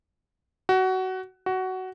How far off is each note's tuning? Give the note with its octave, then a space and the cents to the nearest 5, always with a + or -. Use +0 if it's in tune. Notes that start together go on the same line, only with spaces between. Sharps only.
F#4 +20
F#4 +15